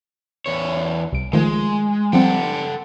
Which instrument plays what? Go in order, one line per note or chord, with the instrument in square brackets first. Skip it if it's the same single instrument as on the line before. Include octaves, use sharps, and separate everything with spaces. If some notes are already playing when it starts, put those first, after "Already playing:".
[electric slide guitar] E2 C#5
[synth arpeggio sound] C2 D7
[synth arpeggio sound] D#3 F3 A3 [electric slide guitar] G#3
[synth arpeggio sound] F3 G3 C4 [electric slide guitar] A4 F#5 G5